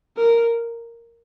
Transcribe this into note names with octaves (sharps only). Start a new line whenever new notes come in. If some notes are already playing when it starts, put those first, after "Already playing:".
A#4